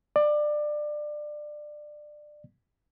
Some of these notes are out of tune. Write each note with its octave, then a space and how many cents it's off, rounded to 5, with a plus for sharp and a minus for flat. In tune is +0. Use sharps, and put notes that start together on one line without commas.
D5 +20